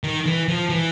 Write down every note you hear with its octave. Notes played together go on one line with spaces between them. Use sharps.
D#3
E3
F3
E3